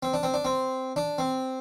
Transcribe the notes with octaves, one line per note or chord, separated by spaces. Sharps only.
C4
D4
C4
D4
C4
D4
C4